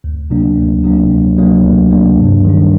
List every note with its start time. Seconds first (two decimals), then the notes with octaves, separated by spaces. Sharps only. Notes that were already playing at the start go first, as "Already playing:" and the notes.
0.04 D2
0.30 C3 F#3 A#3 D4
0.57 D2
0.84 C3 F#3 A#3 D4
1.11 D2
1.38 C3 F#3 A#3 D4
1.64 D2
1.91 C3 F#3 A#3 D4
2.18 G2
2.44 D#3 G3 D4